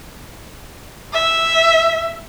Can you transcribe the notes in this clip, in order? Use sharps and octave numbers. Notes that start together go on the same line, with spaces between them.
E5